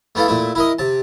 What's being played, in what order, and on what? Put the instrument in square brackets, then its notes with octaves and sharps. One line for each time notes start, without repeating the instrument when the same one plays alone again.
[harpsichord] A3 B3 E4 A4 F5
A#2 A3 E4
E4 A#4 D#5
C3 A5